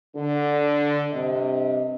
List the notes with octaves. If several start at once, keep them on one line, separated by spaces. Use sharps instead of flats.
D3
G2 C3 D#5